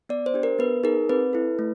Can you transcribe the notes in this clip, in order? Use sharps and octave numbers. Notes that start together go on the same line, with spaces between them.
B3 D5
C5
D4 G4
A#4
B3 B4
D#4 G#4 A#4
C4 B4
E4 A4
A3